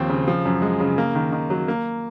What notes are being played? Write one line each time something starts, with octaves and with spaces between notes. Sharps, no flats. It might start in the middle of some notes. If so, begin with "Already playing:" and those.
Already playing: D#2 F3 C4
C#3
F3
F#2
G#3
C#3
A#3
D#3
D#3
F#3
A#3